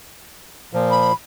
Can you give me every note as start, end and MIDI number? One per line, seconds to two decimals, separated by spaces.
0.73 1.12 46
0.73 1.12 53
0.91 1.14 83